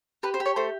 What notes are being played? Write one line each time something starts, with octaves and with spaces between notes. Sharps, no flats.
G4 B4
C5
G4
C#5
A3 C5